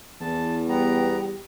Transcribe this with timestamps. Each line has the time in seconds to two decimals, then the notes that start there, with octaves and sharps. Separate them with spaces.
0.21 E2 E3 A5
0.69 G3 B3 G5 A#5